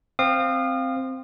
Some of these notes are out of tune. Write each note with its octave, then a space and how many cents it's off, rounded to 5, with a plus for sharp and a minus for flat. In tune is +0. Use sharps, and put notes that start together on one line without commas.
C4 +0 F5 +0 D#6 -35